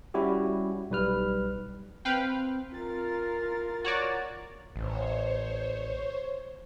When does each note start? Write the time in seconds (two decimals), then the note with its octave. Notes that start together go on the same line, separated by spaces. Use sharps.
0.14 G3 C#4 E4 F#4 G4
0.90 B1 G3 B4 F6
2.05 C4 B4 F5 G5
2.74 F4 A#4 A6
3.85 F#4 C#5 D5
4.76 A1 C5 C#5